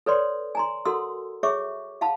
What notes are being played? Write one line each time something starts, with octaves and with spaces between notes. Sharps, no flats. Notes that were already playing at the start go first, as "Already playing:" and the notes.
A4 B4 C#5 D5 C6
G#5 A#5 C6
F#4 A4 A#4 F#5 C6 E6
G#4 C#5 E5 C#6 D6
F5 F#5 A5 B5